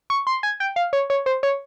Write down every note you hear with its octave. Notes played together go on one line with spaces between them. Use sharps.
C#6
C6
G#5
G5
F5
C#5
C#5
C5
C#5